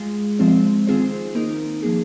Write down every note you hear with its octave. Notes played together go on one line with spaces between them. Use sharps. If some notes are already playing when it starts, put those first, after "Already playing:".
Already playing: G#3 F4 G#4
F3 G#3 C4 F4 C5
D#3 C4 F4 G#4 C5
A#3 D#4 A#4
F3 A#3 G#4